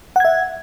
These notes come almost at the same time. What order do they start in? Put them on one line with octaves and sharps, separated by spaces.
F#5 G#6 E5